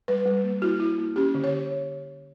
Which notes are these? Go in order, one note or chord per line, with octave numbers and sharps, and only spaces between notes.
G3 B4
G3
A#3
E4 F#4
E4
A#3
C#4 G4
D3
C#5